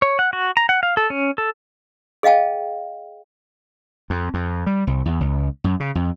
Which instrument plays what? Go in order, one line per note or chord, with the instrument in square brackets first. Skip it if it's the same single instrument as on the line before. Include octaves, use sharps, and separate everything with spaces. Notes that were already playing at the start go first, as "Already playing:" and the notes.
[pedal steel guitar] C#5
F#5
F#4
A#5
F#5
F5
A4
C#4
A4
[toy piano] G#4 D#5 F5 G5 A5
[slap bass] F2
F2
G3
C2
E2
C#2
F#2
C#3
F2